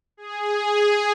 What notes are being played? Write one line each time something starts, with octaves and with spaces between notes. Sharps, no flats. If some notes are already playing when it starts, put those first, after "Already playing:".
G#4